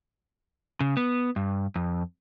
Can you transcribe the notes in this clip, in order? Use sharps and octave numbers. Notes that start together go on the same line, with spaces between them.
C#3
B3
G2
F2